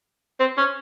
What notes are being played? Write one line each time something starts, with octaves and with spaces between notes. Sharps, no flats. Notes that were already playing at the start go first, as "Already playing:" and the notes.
C4
C#4